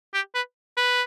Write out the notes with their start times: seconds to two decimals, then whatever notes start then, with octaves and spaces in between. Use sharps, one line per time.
0.14 G4
0.35 B4
0.77 B4